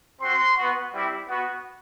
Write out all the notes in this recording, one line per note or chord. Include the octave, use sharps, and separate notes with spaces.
C4 F#4 C6
B3 F#4
G3 C4 E4 G4
B3 F#4